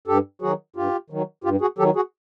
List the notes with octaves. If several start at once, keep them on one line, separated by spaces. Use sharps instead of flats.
G2 G4 A4
D#3 F#3 F#4 G#4
G2 F4 G4
D#3 F#3
G2 F4 G4
F#4 G#4
D#3 F#3 G4 A4
F#4 G#4